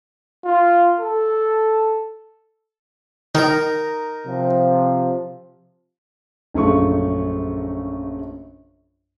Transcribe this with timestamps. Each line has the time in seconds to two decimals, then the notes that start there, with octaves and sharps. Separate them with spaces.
0.45 F4
1.00 A4
3.35 D#3 D#4 A#4 A#5
4.26 C3 F3
6.54 A#1 F#2 C#3 A3 F4 C#6